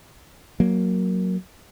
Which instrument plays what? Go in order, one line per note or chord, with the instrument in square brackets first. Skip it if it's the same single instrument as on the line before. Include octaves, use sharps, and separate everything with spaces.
[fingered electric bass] F#3 A#3